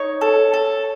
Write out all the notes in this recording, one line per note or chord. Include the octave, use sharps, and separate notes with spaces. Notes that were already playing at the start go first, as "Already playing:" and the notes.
Already playing: D#4 C#5
A4
A4